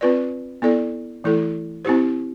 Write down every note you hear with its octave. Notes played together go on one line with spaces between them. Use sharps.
C4 F4 B4 D5
B3 E4 A4 D5
E3 A3 E4 A4
C4 E4 G4 C5